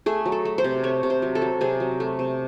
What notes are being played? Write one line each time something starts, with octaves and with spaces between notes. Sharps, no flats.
A3 G#4
F#3
A4
A3
C5
C3
A3 C#5
C3
C5
F#3
A4
F#3
C3 G#4
F#3
A3
C3